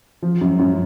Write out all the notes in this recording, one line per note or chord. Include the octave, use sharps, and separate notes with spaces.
F3
F#2
F#2